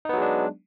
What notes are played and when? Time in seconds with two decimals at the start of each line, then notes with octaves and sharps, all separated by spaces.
0.05 D#4
0.09 B3
0.13 F#3
0.18 G#3
0.22 D4